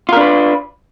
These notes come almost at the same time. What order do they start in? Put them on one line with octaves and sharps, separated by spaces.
F4 A#4 D4 B4